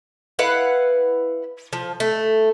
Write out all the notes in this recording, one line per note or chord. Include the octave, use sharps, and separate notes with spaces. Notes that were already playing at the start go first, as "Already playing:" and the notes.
E4 B4 F5 F#5
F3
A3